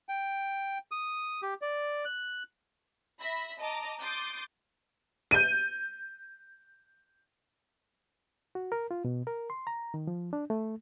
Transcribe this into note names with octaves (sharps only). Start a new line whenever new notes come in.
G5
D#6
G4
D5
F#6
E5 B5 A#6 B6
D#5 A5 A#5 D6
C6 D6 D#6 G6 A6
G6 D#7
F#4
A#4
F4
B2
A#4
C6
A#5
D#3
F3
D4
A3